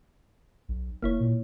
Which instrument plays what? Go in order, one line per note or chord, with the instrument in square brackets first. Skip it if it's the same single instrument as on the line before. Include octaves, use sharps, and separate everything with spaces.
[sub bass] B1
[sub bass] F1 [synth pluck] A#3 E4 C#5
[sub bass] A#2